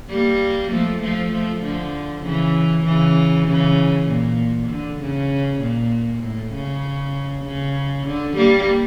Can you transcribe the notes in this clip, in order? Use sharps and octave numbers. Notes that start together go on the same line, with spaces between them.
G3 A#3
F3 A3
F3 A3
F3 A3
D3 F3
C#3 E3
C#3 E3
C#3 E3
A#2
D3
C#3
A#2
A2
C#3
C#3
D3
G3 A#3